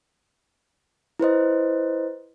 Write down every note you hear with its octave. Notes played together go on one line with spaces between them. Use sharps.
E4 B4 C5 D#5